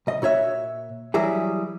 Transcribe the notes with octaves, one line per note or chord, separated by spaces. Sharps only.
B1 D#5
A#2 F#4 C#5 E5
E3 F#3 G3 E4 G#4